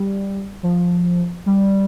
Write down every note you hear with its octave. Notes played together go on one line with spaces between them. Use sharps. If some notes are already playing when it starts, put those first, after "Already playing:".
Already playing: G3
F3
G3